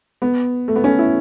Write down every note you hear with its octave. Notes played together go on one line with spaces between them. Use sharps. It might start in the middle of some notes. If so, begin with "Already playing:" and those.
B3
A3
B3
C#4
E4